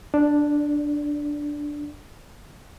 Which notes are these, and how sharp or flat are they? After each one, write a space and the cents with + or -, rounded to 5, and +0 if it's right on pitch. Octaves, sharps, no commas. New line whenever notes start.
D4 +0 D5 +0